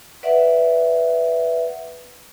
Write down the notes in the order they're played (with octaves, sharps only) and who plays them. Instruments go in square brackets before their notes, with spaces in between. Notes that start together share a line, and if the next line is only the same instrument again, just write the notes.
[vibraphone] B4 D5 E5 F#5